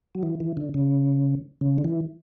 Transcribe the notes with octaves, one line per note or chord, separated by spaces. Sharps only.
F#3
E3
E3
D3
C#3
C#3
D3
E3